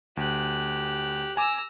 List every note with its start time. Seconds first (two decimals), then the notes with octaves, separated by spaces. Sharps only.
0.17 D2 G4 F#6
1.37 G#5 A#5 D6 E6